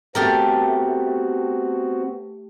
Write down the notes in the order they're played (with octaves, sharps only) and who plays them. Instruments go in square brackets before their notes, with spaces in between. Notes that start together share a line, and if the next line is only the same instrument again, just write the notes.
[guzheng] A3 G4 A#4 [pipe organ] B3 C4 F#4